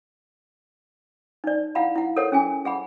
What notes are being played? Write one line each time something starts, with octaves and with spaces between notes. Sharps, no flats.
D#4 D5
E4 F5 F#5 B5
E4 F#5
A4 A#4 C#5 F#5
C#4 G#4 G#5
G#4 F#5 B5